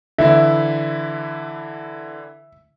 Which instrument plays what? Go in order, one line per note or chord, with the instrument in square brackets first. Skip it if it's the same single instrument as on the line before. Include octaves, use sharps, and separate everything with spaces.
[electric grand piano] D3 E3 E4 [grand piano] E5